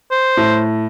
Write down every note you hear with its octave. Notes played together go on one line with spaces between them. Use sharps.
C5
A2